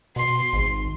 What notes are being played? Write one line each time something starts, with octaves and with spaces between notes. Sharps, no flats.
B2 C6
G#1